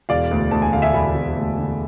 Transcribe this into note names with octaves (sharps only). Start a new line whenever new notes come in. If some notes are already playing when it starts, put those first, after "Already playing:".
E1 D5 F5
D2
D2 A5
G#5
D3 F5
E5 G#5
E1 G#5 B5
E1
D2
D3